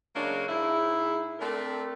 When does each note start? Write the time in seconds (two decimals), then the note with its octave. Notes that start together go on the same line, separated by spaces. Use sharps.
0.16 C#3 F#3 G#3 A#3 D4 C#5
0.48 G#2 E4 G#4
1.40 A3 C4 D4 A4 A#4